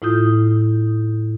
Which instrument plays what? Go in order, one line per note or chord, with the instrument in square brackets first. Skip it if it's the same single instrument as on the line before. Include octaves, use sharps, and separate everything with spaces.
[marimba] A2 E4 F4 D#6 G6